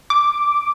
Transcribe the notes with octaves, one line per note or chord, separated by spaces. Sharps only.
D6